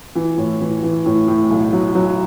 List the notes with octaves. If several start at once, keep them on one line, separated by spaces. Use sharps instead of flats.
E3
A2
E3
E3
A2
A2
B1
F#3
F#3